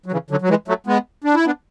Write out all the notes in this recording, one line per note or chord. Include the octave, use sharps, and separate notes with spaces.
F#3
C#3 E3
D3 F#3
F#3
E3 G#3
F#3 A3
G#3 B3
D4
E4
B3 D4